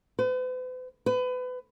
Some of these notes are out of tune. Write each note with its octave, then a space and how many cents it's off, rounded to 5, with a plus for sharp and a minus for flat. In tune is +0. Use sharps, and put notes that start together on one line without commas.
B4 +45
B4 +30